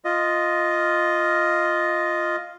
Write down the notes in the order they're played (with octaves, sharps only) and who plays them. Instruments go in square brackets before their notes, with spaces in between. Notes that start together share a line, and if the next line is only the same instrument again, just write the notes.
[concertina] F4 D#5